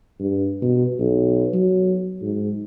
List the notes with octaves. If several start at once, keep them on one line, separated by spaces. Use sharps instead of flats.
G2
B2
B1
F#3
G#2